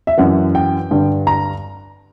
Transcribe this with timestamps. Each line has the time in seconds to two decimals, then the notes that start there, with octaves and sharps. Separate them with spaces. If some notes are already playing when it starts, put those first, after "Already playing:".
0.07 E5
0.17 F#2 E3 F#5
0.55 G5
0.91 G2 D3
1.27 A#5